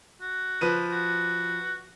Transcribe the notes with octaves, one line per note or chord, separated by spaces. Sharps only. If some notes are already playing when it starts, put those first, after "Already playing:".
F#4
F3 B4 D#7
F#4